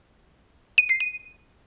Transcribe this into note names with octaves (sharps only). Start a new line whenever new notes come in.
D#7
C7
D#7